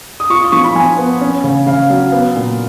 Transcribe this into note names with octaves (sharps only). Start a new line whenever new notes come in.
D#6
F4 C#6
D#6
F3 C#6
B5
F3 G#5
B3
C#4
C#3
C#3 F5
F#3
B3
A#2